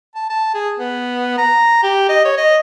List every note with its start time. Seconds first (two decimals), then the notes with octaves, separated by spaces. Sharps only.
0.15 A5
0.30 A5
0.54 G#4
0.79 B3
1.38 A#5
1.83 G4
2.09 D#5
2.25 C#5
2.37 D#5